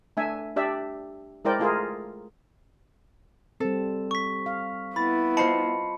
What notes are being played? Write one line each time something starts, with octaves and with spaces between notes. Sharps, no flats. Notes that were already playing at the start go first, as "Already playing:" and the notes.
A3 D4 E5 G#5
D4 G4 D5 E5
G#3 E4 A#4 C5 D5 G5
A3 F4 G#4 A#4
G3 C4 A4
C#6 B6
F5
B3 E4 B5 A6
F4 C5 D#5 A5 B5 C#7